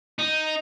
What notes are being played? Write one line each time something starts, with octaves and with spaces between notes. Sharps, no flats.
D#4